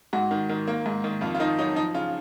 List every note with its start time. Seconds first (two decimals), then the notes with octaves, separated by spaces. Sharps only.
0.13 G#2 F#4
0.31 D#3
0.49 D#3
0.67 A#3
0.86 G#2
1.04 D#3
1.21 F2 F4
1.35 F4
1.40 D#3 D#4
1.59 F#3 D#4
1.76 F3 D#4
1.94 C#3 F4